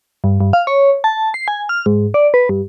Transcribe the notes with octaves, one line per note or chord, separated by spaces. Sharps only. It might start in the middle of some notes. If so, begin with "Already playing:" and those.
G2
G2
F5
C#5
A5
C7
G#5
F6
G#2
D5
B4
G2